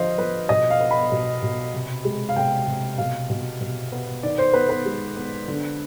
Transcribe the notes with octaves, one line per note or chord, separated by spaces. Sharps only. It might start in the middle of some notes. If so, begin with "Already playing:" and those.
Already playing: D3 F3 C5 D#5 F5
F3 B4
B2 D#5
F5
B3
B5
B2
B2
C3
G#3
F5
C3 G5
C3
B2 F5
B2
B2
B3
D#3 D5
C5
B3 B4
B4
G#3
B3
D3